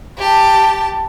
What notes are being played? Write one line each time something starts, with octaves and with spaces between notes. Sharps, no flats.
G4 A5